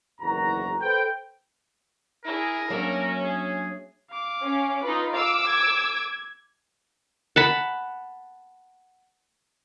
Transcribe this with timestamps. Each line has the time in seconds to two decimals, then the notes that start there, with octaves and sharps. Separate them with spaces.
0.21 F#1 E2 D#3 F#4 A#5
0.81 A4 B4 C5 G5
2.25 E4 G#4 A#4
2.70 F#3 A#3 C#4 D4 E5
3.24 G#4
4.11 F5 D6
4.43 C#4
4.84 D#4 F4 B4
5.14 F5 D6 E6 D7
5.47 G#6
7.36 F#5 A5 B5